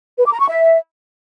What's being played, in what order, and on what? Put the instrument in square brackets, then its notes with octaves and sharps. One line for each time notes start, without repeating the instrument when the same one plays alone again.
[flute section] B4
D6
A#5
C#6
E5